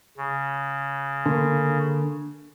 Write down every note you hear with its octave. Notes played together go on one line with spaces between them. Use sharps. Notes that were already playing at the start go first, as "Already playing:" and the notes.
C#3
D3 A#3